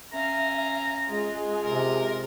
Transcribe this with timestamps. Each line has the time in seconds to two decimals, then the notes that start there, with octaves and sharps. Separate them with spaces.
0.13 C#4 E5 F5 A#5
1.07 G#3 F4 G#4
1.65 C3 A#4